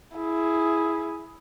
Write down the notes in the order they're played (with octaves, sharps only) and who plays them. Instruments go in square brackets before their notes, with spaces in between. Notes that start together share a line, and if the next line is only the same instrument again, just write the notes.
[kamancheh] E4 G#4